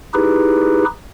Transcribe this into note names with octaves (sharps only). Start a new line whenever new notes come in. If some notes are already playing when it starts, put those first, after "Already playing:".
D#4 E4 G4 G#4 B4